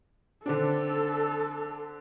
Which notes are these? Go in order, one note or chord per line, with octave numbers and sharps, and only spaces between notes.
D3 C4 D4 A4